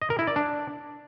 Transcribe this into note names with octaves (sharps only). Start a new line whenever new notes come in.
D#5
A#4
E4
D5
D4